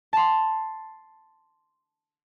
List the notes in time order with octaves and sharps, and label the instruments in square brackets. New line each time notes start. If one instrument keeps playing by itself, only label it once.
[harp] A5 C6